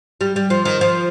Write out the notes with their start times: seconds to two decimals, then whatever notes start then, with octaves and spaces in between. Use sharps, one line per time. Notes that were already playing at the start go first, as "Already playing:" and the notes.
0.21 G3
0.36 G3
0.50 F3
0.65 D#3
0.81 F3